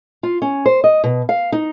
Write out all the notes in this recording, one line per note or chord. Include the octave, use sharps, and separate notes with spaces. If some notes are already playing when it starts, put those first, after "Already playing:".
F4
C#4
C5
D#5
B2
F5
D#4